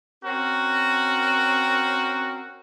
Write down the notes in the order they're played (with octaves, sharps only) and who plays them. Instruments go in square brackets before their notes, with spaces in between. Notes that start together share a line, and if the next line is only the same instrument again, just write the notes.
[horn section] C4 C#4 F#4 A#4